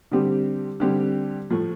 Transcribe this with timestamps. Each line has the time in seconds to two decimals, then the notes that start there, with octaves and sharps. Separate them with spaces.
0.12 D3 G3 C4 G4
0.80 D3 G3 C4 G4
1.50 A2 F3 A3